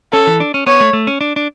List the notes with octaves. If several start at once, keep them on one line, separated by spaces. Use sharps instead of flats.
C#4 A4
E3
D4
C#4
B3 C#5
A3
A3
C#4
D4
D4